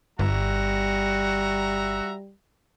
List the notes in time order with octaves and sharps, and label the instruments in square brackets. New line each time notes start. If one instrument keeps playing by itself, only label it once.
[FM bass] G1 [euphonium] G3 [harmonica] F#4 E5 A#5